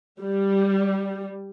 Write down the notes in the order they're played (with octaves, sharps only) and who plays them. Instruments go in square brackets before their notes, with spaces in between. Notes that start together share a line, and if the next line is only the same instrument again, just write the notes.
[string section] G3